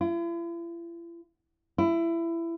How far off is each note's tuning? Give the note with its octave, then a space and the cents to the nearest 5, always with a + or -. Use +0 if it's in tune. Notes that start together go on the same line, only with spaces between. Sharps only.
E4 +45
E4 +20